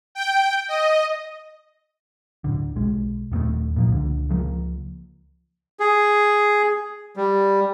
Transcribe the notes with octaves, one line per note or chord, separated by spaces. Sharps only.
G5
D#5
D1 D3
B1 G#3
D#1 D#2 G#2 A3
A#2 F3 A#3
C#2 D3
C#2 F3 A3 A#3
G#4
G3